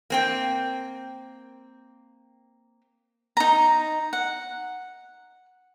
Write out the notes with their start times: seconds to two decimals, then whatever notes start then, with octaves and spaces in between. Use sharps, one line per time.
0.10 A#3 C4 G5
3.37 D#4 A#5
4.13 F#5